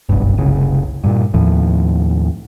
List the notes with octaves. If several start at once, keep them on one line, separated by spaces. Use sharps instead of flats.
F#1 B1 G2
F#1 C2 C#3
G2 A#2
D#2 A2 F3